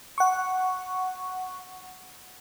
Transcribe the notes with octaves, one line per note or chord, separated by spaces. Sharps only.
F#5 C#6